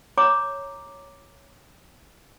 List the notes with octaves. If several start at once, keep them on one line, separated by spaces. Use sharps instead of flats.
C#5 A#5 D6